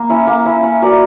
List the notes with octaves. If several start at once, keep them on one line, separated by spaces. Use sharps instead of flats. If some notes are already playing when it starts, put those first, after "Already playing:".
Already playing: A#3
C#4 E4
A#3
C#4 E4
C#4
F#4 A#4 D5